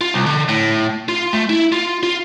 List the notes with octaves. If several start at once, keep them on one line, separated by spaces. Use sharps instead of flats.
F4
C2
D3
A2
F4
A3
E4
F4
F4